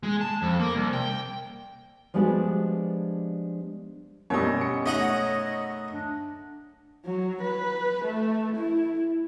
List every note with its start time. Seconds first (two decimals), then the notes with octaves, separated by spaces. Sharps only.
0.03 G#3
0.21 A5
0.42 F2
0.60 A#3
0.75 C2
0.93 G5
2.14 F3 G3 G#3 B3 D4 F#4
4.30 F#2 B2 G3 C#5 D#5
4.61 C#7
4.86 A3 D#4 C#5 D#5 F#5 A#5 D#6
5.94 D4
7.05 F#3
7.41 B4
8.04 A3
8.56 E4